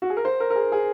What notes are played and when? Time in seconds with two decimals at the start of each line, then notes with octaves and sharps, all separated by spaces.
0.02 F#4
0.10 G#4
0.17 A#4
0.25 C5
0.40 A#4
0.50 A#4
0.55 G#4
0.72 G#4